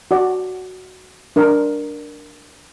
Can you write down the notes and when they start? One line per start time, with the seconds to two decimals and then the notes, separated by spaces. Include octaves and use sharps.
0.11 F#4 D5
1.36 D4 A#4